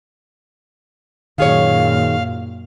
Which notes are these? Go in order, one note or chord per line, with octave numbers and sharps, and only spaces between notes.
F#2 A#2 D#3 G#4 C#5 F5